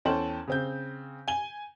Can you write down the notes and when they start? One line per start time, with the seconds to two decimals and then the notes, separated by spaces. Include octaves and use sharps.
0.05 E2 C#4 A4 C5 G5 F#7
0.47 C#3 C4 G6
1.28 G#5 G7